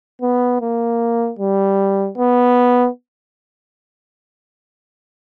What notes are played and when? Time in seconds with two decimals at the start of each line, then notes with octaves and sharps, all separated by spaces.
0.21 B3
0.61 A#3
1.39 G3
2.17 B3